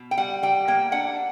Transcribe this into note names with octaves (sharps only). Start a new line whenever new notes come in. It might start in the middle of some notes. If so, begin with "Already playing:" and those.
Already playing: B2
G5
G3 F#5
G3 G5
A#3 G5
D4 F#5